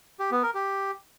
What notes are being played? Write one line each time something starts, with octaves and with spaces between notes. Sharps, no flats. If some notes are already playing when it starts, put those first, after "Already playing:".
G4
B3
A#4
G4